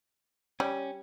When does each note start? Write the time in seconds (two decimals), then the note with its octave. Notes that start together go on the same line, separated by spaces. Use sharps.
0.60 G3 C#4